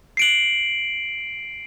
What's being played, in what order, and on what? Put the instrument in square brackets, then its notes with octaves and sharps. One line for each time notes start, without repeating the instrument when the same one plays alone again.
[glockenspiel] C7 D7 F#7